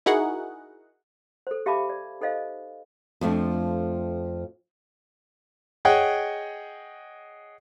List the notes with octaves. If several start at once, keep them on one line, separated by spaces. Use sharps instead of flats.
D#4 E4 F#4 G#4 A#4 F#5
A4 C5
G4 E5 F5 A5 B5 D6
D5
D#4 A4 C5 D#5 F5
F2 F3 A3 D4
G#4 C#5 D#5 F#5 G5